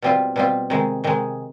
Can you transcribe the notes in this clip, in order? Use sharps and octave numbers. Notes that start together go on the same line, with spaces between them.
B2 G3 C4 F4
B2 G3 C4 F4
C3 D#3 G#3
C3 D#3 G#3